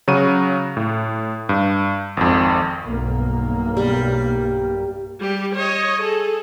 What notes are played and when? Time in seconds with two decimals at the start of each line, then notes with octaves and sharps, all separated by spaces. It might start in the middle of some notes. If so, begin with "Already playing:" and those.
0.08 C#3 F#3 F#4 D#7
0.77 A2
1.49 G2
2.17 G#1 F2
2.85 B1 G2 A#3
3.77 G3
5.19 G3 G4
5.55 C#5 D#5
6.02 G#4 A4